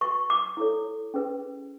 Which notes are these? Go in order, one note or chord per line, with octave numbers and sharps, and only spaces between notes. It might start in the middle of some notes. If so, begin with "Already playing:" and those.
F#4 B4 C#6
D6
E4 A4 C#5
C#4 G#4 B4